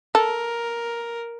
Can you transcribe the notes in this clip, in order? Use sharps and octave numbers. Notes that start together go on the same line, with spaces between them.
A4 A#4